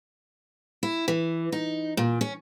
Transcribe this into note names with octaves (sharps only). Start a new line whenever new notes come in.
E4
E3
D#4
A#2
C#4